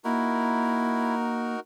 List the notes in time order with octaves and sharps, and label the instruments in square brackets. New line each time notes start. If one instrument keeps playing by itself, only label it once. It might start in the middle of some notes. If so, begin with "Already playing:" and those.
[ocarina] A#3 [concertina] D#4 F#4 A#4 [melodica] E4